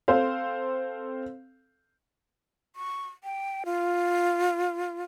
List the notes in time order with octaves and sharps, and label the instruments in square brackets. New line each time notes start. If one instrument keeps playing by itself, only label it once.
[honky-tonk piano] C4 A4 C5 F5
[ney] C#6
G5
F4